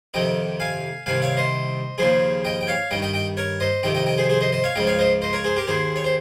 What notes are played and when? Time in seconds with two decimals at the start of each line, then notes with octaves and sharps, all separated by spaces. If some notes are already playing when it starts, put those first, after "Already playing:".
0.14 F2 C3 D#3 D#5 G5
0.60 F5 G#5
1.06 C2 C3 D#3 F5 G#5
1.22 C#5 F5
1.37 C5 D#5
1.98 D#2 C#3 F3 G#4 C5
2.45 D#5 G5
2.61 G5
2.67 C#5 F5
2.91 G2 D#5 G5
2.95 D#3
3.02 D#5 G5
3.13 D#5 G5
3.37 A#4 C#5
3.60 C5 D#5
3.83 F2 C3 D#3 D#5 G5
3.94 D#5 G5
4.06 D#5 G5
4.18 G#4 C5
4.29 G#4 C5
4.41 C5 D#5
4.52 C5 D#5
4.64 C#5 F5
4.75 C#2 C#3 F3 D#5 G5
4.87 C#5 F5
4.99 C5 D#5
5.22 C5 D#5
5.33 A#4 C#5
5.44 G#4 C5
5.56 G4 A#4
5.67 D#2 D#3 G#4 C5
5.96 C#5
6.04 C5